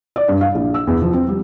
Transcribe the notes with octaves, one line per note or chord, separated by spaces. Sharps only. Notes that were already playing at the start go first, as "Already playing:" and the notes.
D5
G2
F5
A#1
E6
E2
F3
C4
G3